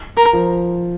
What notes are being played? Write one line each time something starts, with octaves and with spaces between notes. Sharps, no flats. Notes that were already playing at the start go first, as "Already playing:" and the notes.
A#4
F3